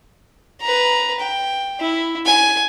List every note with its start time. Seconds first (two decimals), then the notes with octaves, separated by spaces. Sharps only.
0.61 B4 A#5
1.20 G5
1.80 E4
2.26 G#5